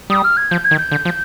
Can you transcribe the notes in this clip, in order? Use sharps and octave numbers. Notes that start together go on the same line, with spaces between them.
G3 D#6
F6
G#6
F3 G6
G#6
D#3
G6
D3
F3